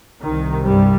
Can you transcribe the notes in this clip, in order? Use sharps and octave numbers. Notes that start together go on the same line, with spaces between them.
C2 C3 D#3
G2 G3